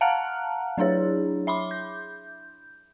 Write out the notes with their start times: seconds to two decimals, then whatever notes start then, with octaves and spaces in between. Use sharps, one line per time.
0.01 F5 F#5 A5 A#5 F6 F#6
0.78 F#3 D4 E4 G#4 C#5
1.47 E5 B5 C6 D6
1.71 G6